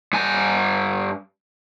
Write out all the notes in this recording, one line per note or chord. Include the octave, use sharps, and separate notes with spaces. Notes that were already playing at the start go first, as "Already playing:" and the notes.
G2 G#5